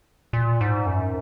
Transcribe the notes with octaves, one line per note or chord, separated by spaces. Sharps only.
A#2
G#2
F#2